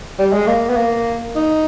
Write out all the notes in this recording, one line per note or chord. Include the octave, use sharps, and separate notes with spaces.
G3
G#3
A#3
B3
A#3
D#4